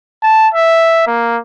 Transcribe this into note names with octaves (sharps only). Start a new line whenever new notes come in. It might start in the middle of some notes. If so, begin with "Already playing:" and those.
A5
E5
A#3